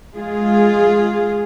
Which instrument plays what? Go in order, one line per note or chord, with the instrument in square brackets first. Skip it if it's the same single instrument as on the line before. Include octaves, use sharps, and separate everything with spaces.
[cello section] G#3 F4 G#4